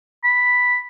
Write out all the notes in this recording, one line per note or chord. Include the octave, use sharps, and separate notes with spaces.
B5